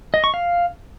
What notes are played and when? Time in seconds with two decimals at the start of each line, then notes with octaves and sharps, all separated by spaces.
0.14 D#5
0.24 C#6
0.34 F5